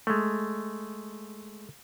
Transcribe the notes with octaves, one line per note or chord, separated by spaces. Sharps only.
G#3 A3